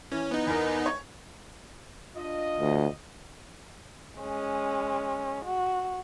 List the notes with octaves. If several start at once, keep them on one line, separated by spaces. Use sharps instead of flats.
E3 C#4
B3 D#4
E2 A#4
C#5
D4 F4 D#5
D2
G#3 C#4
F#4